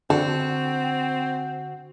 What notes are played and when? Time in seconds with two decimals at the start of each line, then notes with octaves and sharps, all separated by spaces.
0.10 D3 C4 F#4 A4